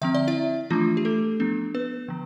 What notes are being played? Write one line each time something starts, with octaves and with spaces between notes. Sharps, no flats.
D3 F3 C4 E5
D5
E4 E5
E3 F3 A3 D4 F4
G4
A3 A4
F3 B3 D4
B3 B4
D3 F3